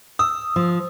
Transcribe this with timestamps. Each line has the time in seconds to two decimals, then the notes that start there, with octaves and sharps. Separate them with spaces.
0.19 D#6 E6
0.56 F3